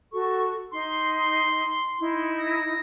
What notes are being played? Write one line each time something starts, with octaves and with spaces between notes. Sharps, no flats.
F#4 A4 C#6
D#4 C6
D#4 E4
A#6